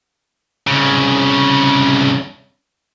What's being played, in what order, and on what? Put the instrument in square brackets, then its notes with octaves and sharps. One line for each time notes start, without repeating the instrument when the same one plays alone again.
[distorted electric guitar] C2 C#3